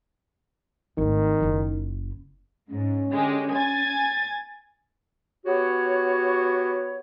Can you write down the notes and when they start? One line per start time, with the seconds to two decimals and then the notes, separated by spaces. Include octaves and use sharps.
0.98 G#1 D#3 A3
1.40 F#1 E4
2.69 G#2 C#4
3.11 D3 G#3 G4
3.53 G#5 G#6 A6
5.46 B3 F#4 G4 C#5